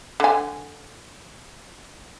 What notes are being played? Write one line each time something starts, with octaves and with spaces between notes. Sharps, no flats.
D3 G#5